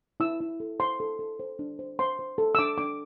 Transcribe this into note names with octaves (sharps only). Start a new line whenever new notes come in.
E4 E6
E4
A4
C5 C6
A4
A4
C5
D4
C5
C5 C6
C5
A4
E6
D4 D6
D4 D6